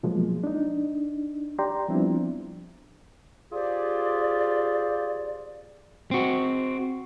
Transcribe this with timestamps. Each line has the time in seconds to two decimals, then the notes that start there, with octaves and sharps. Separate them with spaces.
0.03 B2 F3 F#3 G#3 A#3
0.44 D4 D#4
1.59 G4 D5 G5 A#5 C6
1.89 F3 G3 B3 C4 D4 E4
3.53 F4 G4 G#4 C5 D5
6.11 C4 F#4